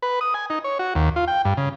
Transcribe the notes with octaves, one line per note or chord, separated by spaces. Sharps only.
B4
D#6
G#5
D#4
C#5
F#4
D#2
F4
G5
G2
C#3